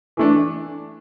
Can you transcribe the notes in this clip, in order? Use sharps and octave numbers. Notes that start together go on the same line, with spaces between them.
E3 A3 D4